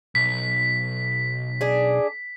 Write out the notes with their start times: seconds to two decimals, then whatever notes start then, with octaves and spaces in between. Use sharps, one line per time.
0.15 B1 B6
1.61 D4 G#4